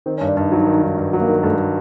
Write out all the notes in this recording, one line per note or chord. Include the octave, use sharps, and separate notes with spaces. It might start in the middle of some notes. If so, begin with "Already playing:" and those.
D#3 C4
C#4
G2
D4
G2 D#4
F#3
D#3
G2
G2
F#3
A#3
D#3
G2 A3
G3